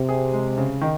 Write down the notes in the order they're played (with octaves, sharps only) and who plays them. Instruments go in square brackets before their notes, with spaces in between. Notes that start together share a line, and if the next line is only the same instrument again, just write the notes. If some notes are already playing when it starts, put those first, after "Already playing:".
Already playing: [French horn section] C3
[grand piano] G#4
G#3
C#3
D#3